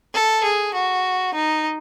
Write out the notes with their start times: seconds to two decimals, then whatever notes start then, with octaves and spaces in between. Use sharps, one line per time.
0.14 A4
0.44 G#4
0.74 F#4
1.34 D#4